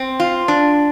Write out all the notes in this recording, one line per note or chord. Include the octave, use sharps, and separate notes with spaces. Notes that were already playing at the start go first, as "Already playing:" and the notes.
Already playing: C4
F4
D4